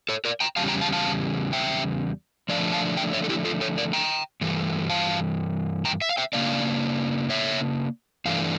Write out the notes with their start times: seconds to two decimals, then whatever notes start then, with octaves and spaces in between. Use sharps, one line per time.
0.09 A4 C#5
0.25 A#4 D5
0.40 G5 A#5
0.56 E2 C#3 G3 F5 A5
0.68 G5 A#5
0.81 F5 A5
0.92 F5 A5
1.53 E5 G5
2.49 D3 F3 A3 D4 D5 F5
2.73 F5 A5
2.97 E5 G5
3.13 C#5 E5
3.24 A4
3.29 E4 G4
3.45 F4 A4
3.61 A4 C#5
3.78 A#4 D5
3.93 G5 A#5
4.41 G2 E3 A3
4.90 F5 A5
5.85 G5 A#5
6.01 E5
6.09 F5
6.17 E5 G5
6.33 C#3 F3 A#3 D4 D5 F5
7.30 C#5 E5
8.25 G2 E3 A3 D4 F5